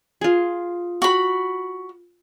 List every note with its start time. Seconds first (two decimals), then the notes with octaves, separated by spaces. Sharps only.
0.21 F4 G#4
1.02 F#4 B5